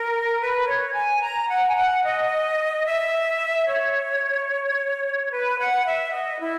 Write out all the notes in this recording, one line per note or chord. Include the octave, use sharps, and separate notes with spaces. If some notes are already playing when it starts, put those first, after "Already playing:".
Already playing: A#4
B4
C#5
G#5
A#5
F#5
G#5
F#5
D#5
E5
C#5
B4
F#5
E5
D#5
E4